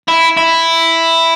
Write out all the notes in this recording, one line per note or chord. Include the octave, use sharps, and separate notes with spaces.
E4
E4